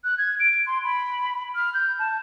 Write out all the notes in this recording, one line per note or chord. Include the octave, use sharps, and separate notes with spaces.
F#6
G#6
D7
C6
B5
F6
G6
A5